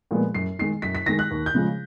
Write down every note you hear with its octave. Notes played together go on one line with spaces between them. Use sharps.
A#2 F3 G#3 B3
F#2 C7
D#3 G#3 C7
F#2 B6
B6
D#3 G#3 A#6
F#6
D#2
G6
C#3 F3 G#3